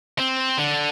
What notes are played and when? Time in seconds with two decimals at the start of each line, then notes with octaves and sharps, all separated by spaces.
0.19 C4
0.58 D3